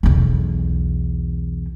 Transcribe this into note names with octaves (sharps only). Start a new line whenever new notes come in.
B1 E2